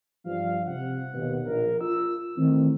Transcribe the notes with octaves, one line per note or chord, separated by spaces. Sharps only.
G2 F3 F5
C3 F#5
D#2 B2
A#1 A#4
F4 E6
D#3 E3 A3 C4